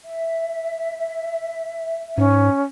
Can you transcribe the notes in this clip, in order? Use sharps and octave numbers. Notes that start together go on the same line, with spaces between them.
E5
G#2 C#4